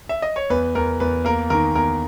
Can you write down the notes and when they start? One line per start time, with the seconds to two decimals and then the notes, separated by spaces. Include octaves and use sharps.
0.09 E5
0.22 D#5
0.36 C#5
0.50 E2 B4
0.75 E2 A#4
1.00 E2 B4
1.25 A#3 A#4
1.50 D#3 A#4
1.75 E2 A#4